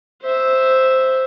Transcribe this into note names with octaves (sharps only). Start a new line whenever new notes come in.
C5 E5